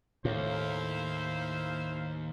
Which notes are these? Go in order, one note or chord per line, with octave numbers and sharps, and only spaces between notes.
D#2 A2 E4 C5 F5